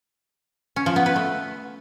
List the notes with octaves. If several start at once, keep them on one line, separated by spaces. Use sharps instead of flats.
C#4
F3
B3
B4
A3